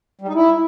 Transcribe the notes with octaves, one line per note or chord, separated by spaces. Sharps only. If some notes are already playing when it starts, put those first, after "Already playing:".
G3
D#4
E4